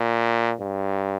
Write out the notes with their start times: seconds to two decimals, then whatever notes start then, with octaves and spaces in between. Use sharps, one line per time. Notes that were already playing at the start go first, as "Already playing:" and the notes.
Already playing: A#2
0.60 G2